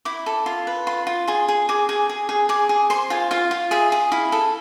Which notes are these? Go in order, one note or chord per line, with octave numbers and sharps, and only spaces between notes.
E4 D6
A4
F4 C6
B4
F4 C6
F4
G#4 C6
G#4
G#4 D6
G#4
G#4
G#4
G#4 D6
G#4
C5 C6
F4 G#5
F4 F5
F4
G#4 E5
G#4
E4 F5
A4